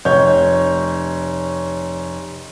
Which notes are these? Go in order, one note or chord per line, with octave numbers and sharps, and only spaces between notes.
F1 C#5 G6